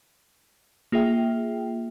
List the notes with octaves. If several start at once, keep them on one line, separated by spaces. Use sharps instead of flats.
A#3 F4 G#4 E5 G5